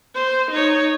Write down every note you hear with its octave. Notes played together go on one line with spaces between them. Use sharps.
C5
D#4 C#5